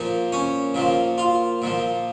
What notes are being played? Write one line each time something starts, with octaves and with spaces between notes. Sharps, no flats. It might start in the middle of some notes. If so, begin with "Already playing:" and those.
Already playing: A#2 F3
C#4
A#2 F3
F4
A#2 F3